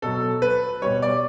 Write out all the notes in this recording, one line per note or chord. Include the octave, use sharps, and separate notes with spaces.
B2 F#3 A4
B4
B2 G3 C#5
D5